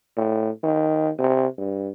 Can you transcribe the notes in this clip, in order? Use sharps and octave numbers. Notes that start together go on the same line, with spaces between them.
A2
D#3
C3
G2